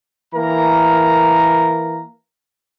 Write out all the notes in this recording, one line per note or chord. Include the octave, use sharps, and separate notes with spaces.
E3 A#3 A#4 A#5